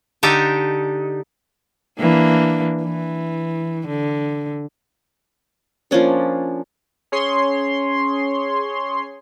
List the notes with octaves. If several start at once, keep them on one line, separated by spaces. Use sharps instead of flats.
D3 D4 D#4 G4 A4
E3 A#3 D4
E3
D3
F3 A#3 C#4 D4
C#4 G#4 C#5 C6